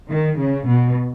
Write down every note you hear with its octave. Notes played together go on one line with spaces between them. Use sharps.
D#3
C#3
B2